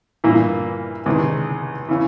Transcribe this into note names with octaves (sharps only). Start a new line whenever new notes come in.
G2 A#2 E3 A#3
C#2 C3 D#3 G#3
C#3 E3